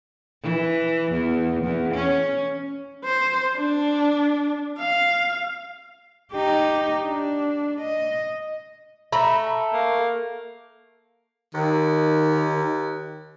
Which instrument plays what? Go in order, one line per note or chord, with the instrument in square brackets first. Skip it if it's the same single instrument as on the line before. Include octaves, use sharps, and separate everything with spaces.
[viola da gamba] E3
E2
E2
C#4
[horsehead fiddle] C5
D4
F5
[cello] D#4 G4
D4
D#5
[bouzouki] A3 [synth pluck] A#5 B5
[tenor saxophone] A#3
[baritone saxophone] D#2 [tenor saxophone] D#3